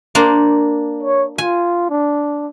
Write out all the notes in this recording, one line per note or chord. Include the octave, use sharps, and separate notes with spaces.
A#3 D4 C5
C#5
F4 G#5
D4